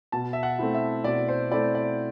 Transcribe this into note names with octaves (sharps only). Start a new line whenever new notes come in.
B2 A5
E5
F#5
A3 C4 E4
E5
B2 D5
C5
A3 C4 E4 D5
D5